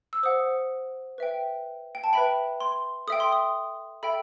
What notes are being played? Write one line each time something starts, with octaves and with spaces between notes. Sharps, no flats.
E6
C5 F#5 D#6
B4 E5 G5
G5
A5
B4 E5 G5 B5
C6
A4 E5 G5 D#6
C6
D#6
A4 E5 G5 B5